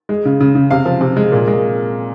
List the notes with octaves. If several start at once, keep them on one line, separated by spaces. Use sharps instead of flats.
G#3
C#3
C#3
C#3
C3 F5
F3
C3
G#3
A#2
G#3